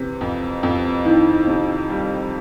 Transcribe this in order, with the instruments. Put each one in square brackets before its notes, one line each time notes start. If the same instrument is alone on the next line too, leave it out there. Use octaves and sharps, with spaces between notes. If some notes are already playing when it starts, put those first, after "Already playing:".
Already playing: [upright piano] C3 E3
F2
F2
[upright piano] D#3 [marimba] E4
[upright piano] C3
G3